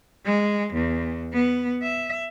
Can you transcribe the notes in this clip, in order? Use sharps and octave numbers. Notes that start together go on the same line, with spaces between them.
G#3
E2
B3
E5